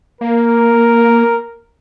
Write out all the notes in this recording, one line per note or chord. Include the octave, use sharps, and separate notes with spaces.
A#3 A#4